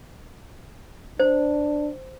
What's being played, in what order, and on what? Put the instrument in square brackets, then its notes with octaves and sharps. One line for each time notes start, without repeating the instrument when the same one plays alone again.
[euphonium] D4 [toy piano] C5